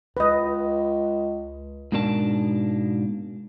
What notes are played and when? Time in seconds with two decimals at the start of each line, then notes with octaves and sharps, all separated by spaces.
0.17 C#2 B4 D#5
1.92 G#2 B2 A#3 D4 A#4 A5